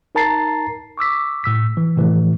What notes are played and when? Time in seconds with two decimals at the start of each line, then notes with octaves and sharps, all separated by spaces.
0.15 D#4 A#4 A5 A#5 A6 C7
0.98 C#6 D6 E6 B6
1.44 A2 E6 B6
1.77 E3
1.97 A2 C3 E3 F3 A3